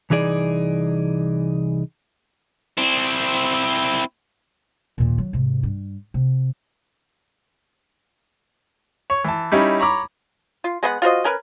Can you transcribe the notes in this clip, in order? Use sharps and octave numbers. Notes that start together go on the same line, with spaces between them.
C2 E3 D#4 G#4 D5
C4 E4
D#2 A#2
F#3
G#2 C3
G2
C3
C#5
E3 A5
G3 C#4 D#4 E4
C#5 A#5 B5 D6
F4
G#3 B3 C5 F#5
F4 F#4 C5 D#5
C#4 A#4 B4